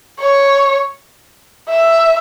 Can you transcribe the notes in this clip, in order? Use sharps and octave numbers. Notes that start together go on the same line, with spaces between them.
C#5
E5